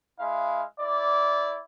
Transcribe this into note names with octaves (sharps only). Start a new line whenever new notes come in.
G#3 E4 F5
E4 D5